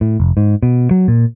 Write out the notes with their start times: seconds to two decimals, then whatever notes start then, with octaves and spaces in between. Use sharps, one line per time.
0.01 A2
0.20 F1
0.37 G#2
0.63 B2
0.91 F#3
1.08 A#2